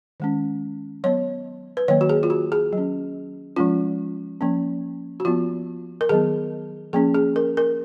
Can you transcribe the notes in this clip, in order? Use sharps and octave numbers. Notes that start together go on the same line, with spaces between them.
D#3 G#3 C#4
F#3 B3 C#5
B4
D#3 F#3 A#3 C#5
F#4
G#4
F4
F#4
G#4
F#3
C#4
F3 G#3 C#4 F4
F3 A#3 C#4
F#4
F3 B3 F4
A#4
D#3 F#3 B3 G#4
F3 A#3 C#4 G#4
G#4
A#4
A#4